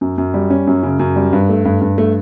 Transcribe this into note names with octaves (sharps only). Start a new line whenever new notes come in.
F#2
F#2
G3
C#4
F#2
C#3
F#2
G3
G2
A3
G2
G2
A3